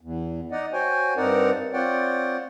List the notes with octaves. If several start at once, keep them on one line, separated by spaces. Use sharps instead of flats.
E2
D#4 D5 D#5 F#5
F#4 C5 C#5 G5 G#5
G2 C4 D#4 A#4 D5 F#5
C4 F4 C#5 D5 F#5 G5